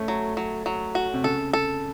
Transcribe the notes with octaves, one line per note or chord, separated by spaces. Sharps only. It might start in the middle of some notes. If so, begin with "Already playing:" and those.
Already playing: A3 C#4
F#3
F#3
F#3
F#4
C3
C#3 A4
A4